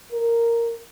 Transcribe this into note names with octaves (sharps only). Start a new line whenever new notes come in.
A#4